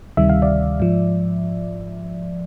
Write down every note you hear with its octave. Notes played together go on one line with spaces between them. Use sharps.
D2 C3 D#3 G3 E5
F5
D5 E5
G#2 F3